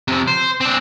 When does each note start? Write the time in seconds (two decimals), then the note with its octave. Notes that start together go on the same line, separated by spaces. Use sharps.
0.08 C3 F3
0.28 C5
0.61 C4 D4